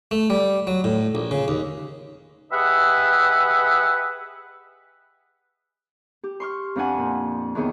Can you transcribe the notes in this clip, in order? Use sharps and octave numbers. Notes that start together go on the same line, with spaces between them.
A3
G3
F#3
A2
A#1
C#3
D#2
G4 G#4 B4 D#5 E5 F#5
G4
C6 C#6 F6
F2 F3 D4 F#5 G#5
A#2
E2 D#3 G#4 C#5 G5